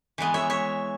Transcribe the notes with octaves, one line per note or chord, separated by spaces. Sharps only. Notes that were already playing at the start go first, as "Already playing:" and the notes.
E3 G#3 B3
C#5 E5
C#5 E5